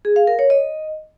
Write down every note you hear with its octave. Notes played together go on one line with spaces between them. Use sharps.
G#4
F5
A#4
C#5
D#5